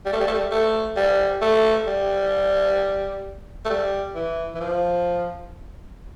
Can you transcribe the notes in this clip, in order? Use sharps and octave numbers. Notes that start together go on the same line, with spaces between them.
G3
A3
G3
A3
G3
A3
G3
A3
G3
A3
G3
E3
E3
F3